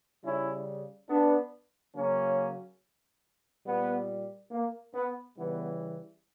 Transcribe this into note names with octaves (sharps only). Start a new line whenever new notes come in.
C#3 G3 C#4 E4
B3 D4
C#3 F#3 A#3 C#4
A#2 G3 B3
A#3
B3
C#3 E3 G3 B3